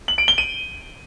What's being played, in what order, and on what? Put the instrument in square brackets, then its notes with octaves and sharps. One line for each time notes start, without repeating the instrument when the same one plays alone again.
[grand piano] F#7
D7
G7
D#7